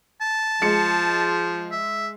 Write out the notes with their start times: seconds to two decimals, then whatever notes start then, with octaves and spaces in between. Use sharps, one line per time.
0.21 A5
0.62 F3 G#3 C#7
1.72 E5